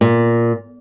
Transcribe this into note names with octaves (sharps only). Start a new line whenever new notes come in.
A#2